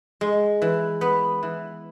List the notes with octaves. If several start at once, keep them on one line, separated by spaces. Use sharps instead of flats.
G#3
E3
B3
E3